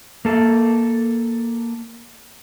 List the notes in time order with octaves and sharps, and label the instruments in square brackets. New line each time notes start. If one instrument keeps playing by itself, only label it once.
[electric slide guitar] A#3 A4